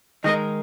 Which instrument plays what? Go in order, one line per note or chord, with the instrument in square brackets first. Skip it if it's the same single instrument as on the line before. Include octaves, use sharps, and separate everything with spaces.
[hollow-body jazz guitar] D#3 G#3 D#4 A#4 [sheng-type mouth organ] D#5